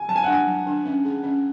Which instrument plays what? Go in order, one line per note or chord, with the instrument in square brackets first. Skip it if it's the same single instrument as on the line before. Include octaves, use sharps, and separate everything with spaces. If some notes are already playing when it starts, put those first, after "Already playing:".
Already playing: [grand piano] G#5
[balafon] F#3 [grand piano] A5
[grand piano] G#5
F#5
[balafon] D4 [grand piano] G#5
[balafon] F#3
D4
C#4
G#4
C#4